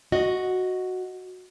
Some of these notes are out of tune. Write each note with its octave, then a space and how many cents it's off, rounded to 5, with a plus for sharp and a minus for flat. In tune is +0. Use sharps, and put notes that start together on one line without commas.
F#4 -5 D#5 +5